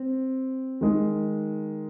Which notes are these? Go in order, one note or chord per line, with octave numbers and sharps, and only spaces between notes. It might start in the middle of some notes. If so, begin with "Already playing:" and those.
Already playing: C4
D#3 G#3 D#4